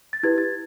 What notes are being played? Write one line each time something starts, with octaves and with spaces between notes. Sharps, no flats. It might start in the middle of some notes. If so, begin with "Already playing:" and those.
A6
E4 G4 B4 G#6
A6